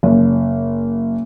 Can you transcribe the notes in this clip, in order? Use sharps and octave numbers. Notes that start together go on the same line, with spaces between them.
F#1